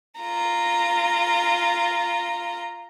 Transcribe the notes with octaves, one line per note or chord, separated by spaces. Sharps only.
F4 A#5